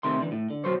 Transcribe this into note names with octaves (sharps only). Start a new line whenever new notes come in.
C3 D#3 A3 C6
D3 E3
A2
D3
B1 F#2 F#3 C5 C#5